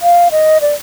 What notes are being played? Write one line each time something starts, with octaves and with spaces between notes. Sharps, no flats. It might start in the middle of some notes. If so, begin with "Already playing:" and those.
F5
D#5
D5